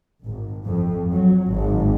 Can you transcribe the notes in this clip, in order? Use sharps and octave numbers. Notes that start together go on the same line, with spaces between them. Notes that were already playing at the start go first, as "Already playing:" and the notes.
G#1
F2
F#3
G#1